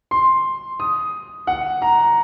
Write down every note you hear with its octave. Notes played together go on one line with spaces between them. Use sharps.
C6
D#6
F#5
A#5